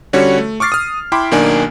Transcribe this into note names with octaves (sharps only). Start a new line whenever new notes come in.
D3 G3 C#4 F#4 C#5
A3
C#6 D6 F6 A6 C7
D#6 F6
E4 G5 B5 C6 D6
B1 D#3 A#3 D4 G#5